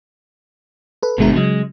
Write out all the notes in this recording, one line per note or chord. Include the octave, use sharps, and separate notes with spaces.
A4 B4
G1 B2 D3 G#3 A3 A#4
C#3 F#3 G#3